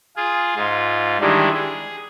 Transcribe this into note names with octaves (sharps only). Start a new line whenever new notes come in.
F4 G#4
G#2 F4
D#3 E3 G3 G#3 D4
G#4